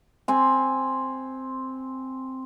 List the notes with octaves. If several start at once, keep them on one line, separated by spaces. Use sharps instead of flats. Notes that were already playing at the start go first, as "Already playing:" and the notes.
C4 G#5